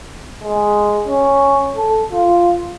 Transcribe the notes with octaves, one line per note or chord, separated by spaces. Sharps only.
G#3
C#4
A4
F4